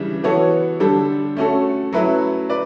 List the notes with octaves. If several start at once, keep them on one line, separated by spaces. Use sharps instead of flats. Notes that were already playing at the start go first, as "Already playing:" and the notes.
Already playing: C#3 E3 G3 D4
E3 B3 F#4 A4 C#5
D3 G3 D4 A4
A3 C#4 F#4 A4
F#3 A3 C#4 E4 B4
B4 D5